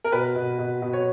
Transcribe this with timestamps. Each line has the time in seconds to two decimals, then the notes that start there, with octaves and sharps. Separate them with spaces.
0.04 A#4
0.12 B2 B4
0.35 B2
0.59 B2
0.82 B2
0.93 C#5